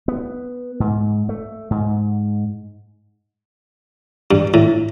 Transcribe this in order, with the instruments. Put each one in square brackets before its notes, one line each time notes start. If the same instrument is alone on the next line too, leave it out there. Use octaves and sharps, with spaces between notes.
[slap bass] B3
G#2
A3
G#2
[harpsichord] G2
A2